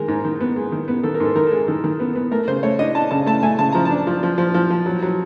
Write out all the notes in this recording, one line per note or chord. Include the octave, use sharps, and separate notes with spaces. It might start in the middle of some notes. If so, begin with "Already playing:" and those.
Already playing: D#3 G#3 A#4
G#2
D#3
B3
G#3
D#3
B3
D#3 A4
A#4
G#2 A4
D#3 A#4
A4
G#3
D#3 A4
D#3
B3
B3
A3 A#4
C#3 C5
A3 C#5
D4 D#5
D4 A5
C#3 A5
A3 A5
A3 G#5
C#3 A5
F3 A#5
A5
D4
F3
F3
F3
F3
F3
F#3
F#3